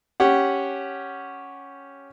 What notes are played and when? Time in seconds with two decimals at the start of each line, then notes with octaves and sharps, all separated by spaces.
0.20 C#4 G4 F#5